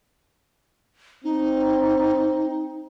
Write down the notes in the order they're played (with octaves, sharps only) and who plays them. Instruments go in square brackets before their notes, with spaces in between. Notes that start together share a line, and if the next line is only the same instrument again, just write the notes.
[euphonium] C4 [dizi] D#4